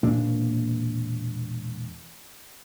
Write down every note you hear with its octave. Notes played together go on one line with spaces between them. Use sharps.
E1 A#2 A#3 D4